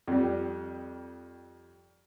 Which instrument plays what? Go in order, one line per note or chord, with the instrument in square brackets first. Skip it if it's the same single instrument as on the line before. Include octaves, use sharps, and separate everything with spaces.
[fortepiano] F2 G3